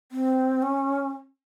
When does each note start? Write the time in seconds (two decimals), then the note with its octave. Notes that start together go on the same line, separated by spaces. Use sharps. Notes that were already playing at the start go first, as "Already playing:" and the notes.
0.12 C4
0.62 C#4